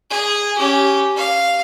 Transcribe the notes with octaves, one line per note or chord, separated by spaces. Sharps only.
G#4
C#4 G4
F5